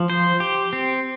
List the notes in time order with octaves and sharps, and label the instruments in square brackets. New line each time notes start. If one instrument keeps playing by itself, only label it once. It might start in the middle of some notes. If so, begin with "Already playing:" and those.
Already playing: [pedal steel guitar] F3
C5
G4
C4